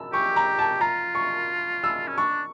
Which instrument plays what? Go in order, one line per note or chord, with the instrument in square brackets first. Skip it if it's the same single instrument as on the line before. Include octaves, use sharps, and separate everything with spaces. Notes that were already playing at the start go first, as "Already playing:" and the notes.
Already playing: [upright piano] E6
[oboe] G4 [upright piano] C#6
[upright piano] A#5
A5
[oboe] F4 [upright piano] A#5
[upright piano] C#6
E6
[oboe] C#4
[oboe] D4 [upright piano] C#6